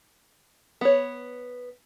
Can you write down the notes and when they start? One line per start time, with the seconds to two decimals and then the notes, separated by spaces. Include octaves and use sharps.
0.81 B3 C#5